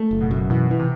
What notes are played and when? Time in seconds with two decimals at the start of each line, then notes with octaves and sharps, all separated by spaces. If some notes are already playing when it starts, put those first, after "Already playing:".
Already playing: A3
0.11 F#1
0.21 B2
0.31 F#2
0.50 B2 E3
0.71 E3
0.80 C3